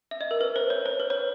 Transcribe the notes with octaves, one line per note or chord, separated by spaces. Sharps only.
E5
D#5
A#4
B4
C5
C#5
C5
B4
C#5